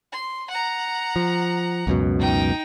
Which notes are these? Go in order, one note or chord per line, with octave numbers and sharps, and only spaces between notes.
C6
F#5 A#5
F3
C#2 F#2 B2
D#4 G5